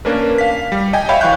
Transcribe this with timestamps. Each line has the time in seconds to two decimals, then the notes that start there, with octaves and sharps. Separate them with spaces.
0.05 A#3 C#4 D4 A#4 B4
0.38 F5 B6
0.72 G3
0.93 D#5 G5 G#5
1.09 C#5 E5 F5 G5 B5
1.21 E3 F5 C#6 F#6 G6